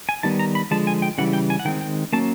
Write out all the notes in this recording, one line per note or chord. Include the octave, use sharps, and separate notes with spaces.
G#5
D#3 G3 B3 A5
A#5
B5
D3 F3 G#3 A5
G#5
G5
C#3 E3 G3 F#5
G5
G#5
F#5
D#3 G#3 C4 G5
G5
F#3 A#3 C#4 A5